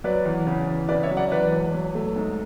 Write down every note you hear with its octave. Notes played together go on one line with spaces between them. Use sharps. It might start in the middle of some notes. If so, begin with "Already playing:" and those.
F#3 B4 D5
E2
C#3
E2
C#3 B4 D5
C#5 E5
F#3
D5 F#5
E2 B4 D5
E1
F#3
A3
G#2